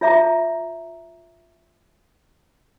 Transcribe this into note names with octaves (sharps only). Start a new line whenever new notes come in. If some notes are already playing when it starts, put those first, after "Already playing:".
F4 C#5 E5 A#5 D6